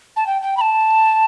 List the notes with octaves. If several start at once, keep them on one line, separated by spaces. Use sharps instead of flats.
A5
G5
G5
B5
A5